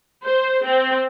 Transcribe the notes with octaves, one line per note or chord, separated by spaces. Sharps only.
C5
C4